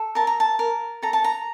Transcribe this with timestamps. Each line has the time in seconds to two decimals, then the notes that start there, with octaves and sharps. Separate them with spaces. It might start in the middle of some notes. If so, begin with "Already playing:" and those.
Already playing: A4
0.15 A#4 A5
0.27 A#5
0.40 A5
0.59 A#4
1.03 A4 A#5
1.13 A5
1.24 A#5